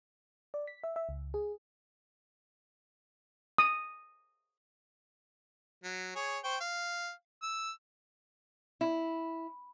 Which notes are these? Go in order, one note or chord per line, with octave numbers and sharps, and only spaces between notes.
D5
B6
E5
E5
C#2
G#4
D#6
F#3
G#4 C#5
C5 G5 C#6
F5
E6
E4